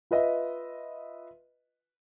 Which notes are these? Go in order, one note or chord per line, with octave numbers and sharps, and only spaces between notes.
F4 B4 D#5 E5